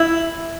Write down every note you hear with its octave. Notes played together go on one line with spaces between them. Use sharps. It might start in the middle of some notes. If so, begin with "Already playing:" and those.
Already playing: E4